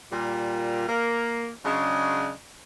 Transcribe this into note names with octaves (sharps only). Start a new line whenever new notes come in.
A#2 G3
A#3
C#3 F#3 G#3 D4